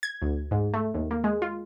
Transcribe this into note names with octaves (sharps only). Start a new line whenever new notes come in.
G#6
D2
G#2
A3
D#2
A#3
G#3
F4